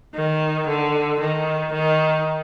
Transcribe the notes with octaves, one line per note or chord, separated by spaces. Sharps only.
D#3
D3
D#3
D#3